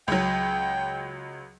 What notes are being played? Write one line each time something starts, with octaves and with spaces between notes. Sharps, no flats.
C#2 F#3 G5